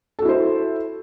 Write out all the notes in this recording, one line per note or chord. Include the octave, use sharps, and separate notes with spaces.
E4 F#4 A4 C5